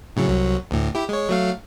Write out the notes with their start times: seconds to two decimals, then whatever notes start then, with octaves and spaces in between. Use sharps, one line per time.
0.16 A2 C#3 F#3
0.28 C2 F#3
0.71 D2 A2
0.95 E4 G4
1.09 G#3 C#5
1.29 F#3 A3 F5